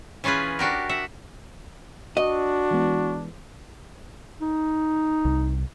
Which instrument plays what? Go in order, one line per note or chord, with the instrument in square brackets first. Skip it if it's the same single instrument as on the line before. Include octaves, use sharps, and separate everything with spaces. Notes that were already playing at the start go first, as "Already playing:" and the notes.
[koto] E3 C#4 F4 G#4 B4
D4 F#4 G4 A#4
E5 F#5
[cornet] D4 [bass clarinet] F#4 [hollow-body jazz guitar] D#5
[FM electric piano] E3 G#3 B3
[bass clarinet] D#4
[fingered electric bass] C2